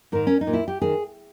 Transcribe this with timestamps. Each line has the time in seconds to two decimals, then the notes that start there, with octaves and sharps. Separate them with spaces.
0.12 G#2 D#3 A#4
0.27 C#4
0.41 D#4
0.47 A#2
0.53 E4
0.68 G4
0.82 D#3 G#4